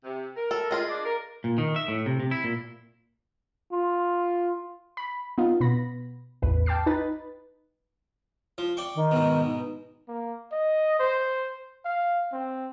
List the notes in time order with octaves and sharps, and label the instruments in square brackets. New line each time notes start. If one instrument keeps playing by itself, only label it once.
[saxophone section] C3
A#4
[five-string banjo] A4
F4 G#4 D#5
[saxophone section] D4 D5
A#4
[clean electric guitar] A#2
D#3
E5
A2
C3
C3
E4
A#2
[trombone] F4
[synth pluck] B5
B3 D#4 F4
B2 B3 B5 A#6
A1 E2 B4
G5 A5 D6 F6 C7
D#4 B4 A6
[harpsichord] F3
D5 G5 C#6
[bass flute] D#3
[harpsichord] G#2 B2
[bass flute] D#4
[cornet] A#3
D#5
C5
F5
C4